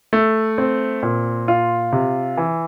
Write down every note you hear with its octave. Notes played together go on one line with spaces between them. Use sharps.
A3
C4
A#2
F4
C3
E3